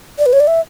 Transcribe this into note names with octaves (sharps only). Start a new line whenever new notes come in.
D5
B4
C#5
D5
E5